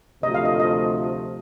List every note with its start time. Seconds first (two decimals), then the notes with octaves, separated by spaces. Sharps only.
0.23 D2 C3 F3 A3 D#5
0.34 F5
0.45 D#5
0.60 D#5